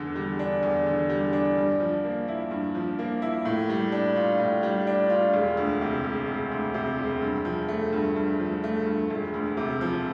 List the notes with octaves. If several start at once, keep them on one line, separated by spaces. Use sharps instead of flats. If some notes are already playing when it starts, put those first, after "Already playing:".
Already playing: E2 D3
G3
D4
E2
D3
G3
D4
G2
F3
A#3
E4
G2
F3
A#3
E4
A2
G3
D4
F4
A2
G3
D4
F4
E1
D2
C3
E1
E1
D2
C3
E1
G2
F3
A3
G2
G2
F3
A3
G2
E1
D2
C3
F3